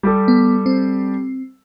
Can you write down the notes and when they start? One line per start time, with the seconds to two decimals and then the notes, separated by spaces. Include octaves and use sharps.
0.03 G3 G4 A4
0.28 B3
0.66 C4